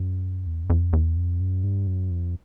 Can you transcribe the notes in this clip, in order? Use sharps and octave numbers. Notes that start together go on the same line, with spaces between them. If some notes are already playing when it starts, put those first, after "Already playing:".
Already playing: F#2
E2
F#2
F2
E2
F2
F#2
G2
F#2
F2